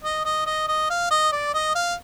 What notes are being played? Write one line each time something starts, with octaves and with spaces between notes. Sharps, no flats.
D#5
D#5
D#5
D#5
F5
D#5
D5
D#5
F5